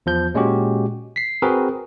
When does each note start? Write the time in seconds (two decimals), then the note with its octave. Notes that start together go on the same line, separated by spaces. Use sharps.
0.06 E2 F3 G6
0.34 A#2 G#3 C#4 F#4 G4
1.16 B6 C7
1.42 C4 F#4 G#4 A#4 B4